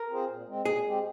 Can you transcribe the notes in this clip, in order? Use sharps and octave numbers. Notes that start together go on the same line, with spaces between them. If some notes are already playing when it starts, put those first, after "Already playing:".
Already playing: A#4
C4 F4 G#4 C5
A#2
G#3 C4
A#2 G#4
G#3 C4 G4